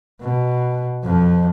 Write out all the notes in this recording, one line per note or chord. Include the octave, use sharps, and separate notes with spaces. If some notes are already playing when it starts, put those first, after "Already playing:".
B2
F2 F3